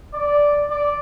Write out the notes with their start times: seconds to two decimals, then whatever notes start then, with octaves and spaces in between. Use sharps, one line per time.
0.14 D5
0.70 D5